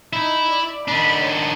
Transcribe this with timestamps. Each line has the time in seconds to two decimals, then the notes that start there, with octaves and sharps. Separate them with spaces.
0.13 D#4 E4
0.51 D5
0.88 D#3 D4 B5
1.24 C#5